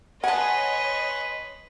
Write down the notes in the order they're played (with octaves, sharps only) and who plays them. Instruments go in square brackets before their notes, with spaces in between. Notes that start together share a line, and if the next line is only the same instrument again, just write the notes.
[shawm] B4 [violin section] C#5 D#5 C6 [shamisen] F#5 [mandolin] G#5 A5